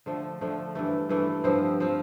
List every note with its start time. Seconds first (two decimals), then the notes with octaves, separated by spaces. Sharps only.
0.06 D3 F3 A3
0.41 D3 F3 A3
0.75 G2 E3 A3
1.09 G2 E3 A3
1.44 G2 F3 C4
1.80 F3 C4